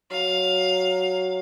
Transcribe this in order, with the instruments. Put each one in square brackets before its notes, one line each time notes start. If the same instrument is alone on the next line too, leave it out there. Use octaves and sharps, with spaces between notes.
[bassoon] F#3 [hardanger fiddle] F5